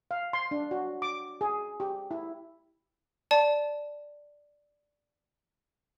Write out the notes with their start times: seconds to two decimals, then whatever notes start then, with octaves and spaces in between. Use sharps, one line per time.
0.11 F5
0.33 C6
0.51 D4
0.71 F#4
1.02 D6
1.41 G#4
1.80 G4
2.11 E4
3.31 D5 A5